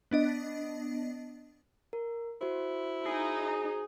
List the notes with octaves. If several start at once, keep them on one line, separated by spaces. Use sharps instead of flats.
B3 D4 D#5
A#4
E4 F#4 C5
D#4 G#4